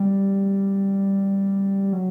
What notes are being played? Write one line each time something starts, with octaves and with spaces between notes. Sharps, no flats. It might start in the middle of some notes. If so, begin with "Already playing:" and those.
Already playing: G3
F#3